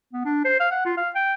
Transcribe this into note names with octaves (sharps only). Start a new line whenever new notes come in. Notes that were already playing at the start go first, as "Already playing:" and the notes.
B3
D4
C5
F5
F#5
F4
F5
G5